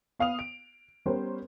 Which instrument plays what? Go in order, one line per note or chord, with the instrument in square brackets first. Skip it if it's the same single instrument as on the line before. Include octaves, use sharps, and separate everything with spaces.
[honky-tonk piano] B3 F5 D#6 F7
D7
G3 B3 C#4 A#4 C5